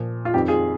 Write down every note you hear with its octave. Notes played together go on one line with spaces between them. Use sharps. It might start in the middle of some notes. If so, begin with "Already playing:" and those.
Already playing: A#2 F3
F4
F2 D#3 G4
F4 G#4